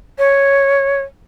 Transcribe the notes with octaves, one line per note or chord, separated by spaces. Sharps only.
C#5